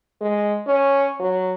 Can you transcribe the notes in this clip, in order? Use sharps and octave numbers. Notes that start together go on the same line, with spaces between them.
G#3
C#4
F#3